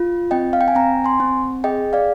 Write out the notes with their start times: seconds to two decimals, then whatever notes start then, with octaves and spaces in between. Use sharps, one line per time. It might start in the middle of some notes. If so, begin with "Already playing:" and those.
Already playing: F4
0.31 C4 D#5 G5
0.53 F5
0.61 G5
0.68 G#5
0.75 C4 G5 A#5
1.04 G#5 C6
1.20 C4
1.64 G#4 D#5 G5
1.93 D5 F5